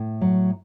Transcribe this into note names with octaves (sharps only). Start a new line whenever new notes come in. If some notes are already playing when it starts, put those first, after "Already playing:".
Already playing: A2
F#3